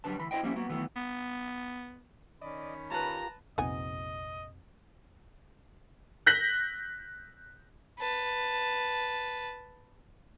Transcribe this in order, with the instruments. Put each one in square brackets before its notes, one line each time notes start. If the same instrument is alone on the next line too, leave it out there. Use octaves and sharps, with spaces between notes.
[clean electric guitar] D3 F#3 G3 D4 B4 A5
D2 E3 B5
E4 C5 D#5 G5
F3 G3 A#3 C4 C#4 E4
F#3 A#3 B3 F#4
D#3 E3 F#3 A3 B3
[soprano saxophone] B3
[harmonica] D#3 C#4 B5 [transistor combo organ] D5 D#5
[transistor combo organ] F4 G4 A#4 [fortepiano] B4 A5 [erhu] A#5
[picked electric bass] A#1 F2 C3 [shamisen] B3 D#4 G#5 [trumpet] D#5
[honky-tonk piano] F#6 G6 A#6 B6 F#7
[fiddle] B4 A5